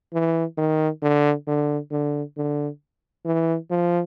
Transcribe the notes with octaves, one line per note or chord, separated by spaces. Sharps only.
E3
D#3
D3
D3
D3
D3
E3
F3